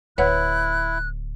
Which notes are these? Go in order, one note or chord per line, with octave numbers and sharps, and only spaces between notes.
D1 E4 B4 C#5 F#5 F#6